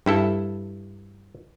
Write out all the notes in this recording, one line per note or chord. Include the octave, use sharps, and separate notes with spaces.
G2 E4 A4